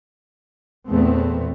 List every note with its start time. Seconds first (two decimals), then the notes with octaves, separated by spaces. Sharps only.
0.89 E2 A#2 A3 B3 C4